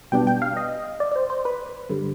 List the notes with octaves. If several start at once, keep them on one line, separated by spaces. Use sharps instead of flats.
B1 B2 G3 B3 D4 G5
G5
F5
D#5
D5
D5
C5
C5
B4
G2 D3 G3